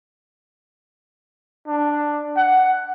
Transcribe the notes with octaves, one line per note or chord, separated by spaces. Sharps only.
D4
F#5